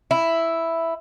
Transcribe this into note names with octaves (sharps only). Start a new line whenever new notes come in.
E4